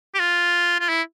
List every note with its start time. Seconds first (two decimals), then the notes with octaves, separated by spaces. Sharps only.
0.14 G4
0.20 F4
0.80 F4
0.89 E4